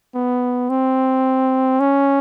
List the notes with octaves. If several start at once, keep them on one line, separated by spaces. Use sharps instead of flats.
B3
C4
C#4